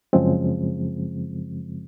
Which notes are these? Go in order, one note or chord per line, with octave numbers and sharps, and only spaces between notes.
F#2 C#3 F3 G#3 C4